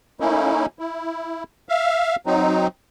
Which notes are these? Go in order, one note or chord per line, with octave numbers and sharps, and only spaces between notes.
A3 A#3 C#4 D#4 E4
E4
E5 F5
F#3 C4 D#4